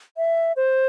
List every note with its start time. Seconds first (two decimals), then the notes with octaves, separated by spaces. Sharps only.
0.17 E5
0.56 C5